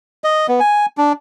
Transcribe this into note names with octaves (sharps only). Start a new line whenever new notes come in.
D#5
B3
G#5
D4